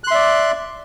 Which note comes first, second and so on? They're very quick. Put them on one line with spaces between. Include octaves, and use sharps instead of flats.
F#6 C6 E5 D5